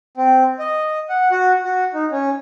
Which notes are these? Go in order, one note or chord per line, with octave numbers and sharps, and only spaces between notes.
C4
D#5
F#5
F#4
F#4
D#4
C#4